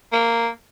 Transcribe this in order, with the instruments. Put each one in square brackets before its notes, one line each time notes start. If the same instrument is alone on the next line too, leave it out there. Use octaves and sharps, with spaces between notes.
[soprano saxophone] A#3